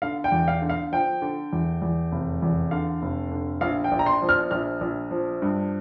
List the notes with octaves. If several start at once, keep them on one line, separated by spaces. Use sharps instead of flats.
D3 F5
G5
E2
F5
D3
F5
F3 G5
D3
E2
E2
F1
E2
D3 F5
F1
D3
A#1 F5
G5
A#1
A#5
C6
F3
F6
A#1 F6
A#1
F3
G2